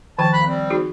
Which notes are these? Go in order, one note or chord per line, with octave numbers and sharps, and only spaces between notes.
D#3 F3 G5 A5
D#2 B5 F#6
G3 C4
D#4 F#4 G#4